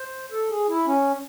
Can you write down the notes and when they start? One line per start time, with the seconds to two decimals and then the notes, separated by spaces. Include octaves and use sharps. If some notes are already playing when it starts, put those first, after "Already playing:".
Already playing: C5
0.32 A4
0.50 G#4
0.69 E4
0.87 C#4